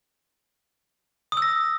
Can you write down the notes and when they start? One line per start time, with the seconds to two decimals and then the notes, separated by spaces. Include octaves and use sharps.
1.32 D#6
1.37 E6
1.42 A#6